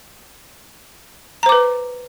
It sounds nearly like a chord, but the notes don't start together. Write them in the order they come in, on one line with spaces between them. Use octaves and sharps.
A#5 C5 D6 B4